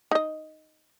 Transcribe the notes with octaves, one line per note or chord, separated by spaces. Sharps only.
D#4 D#5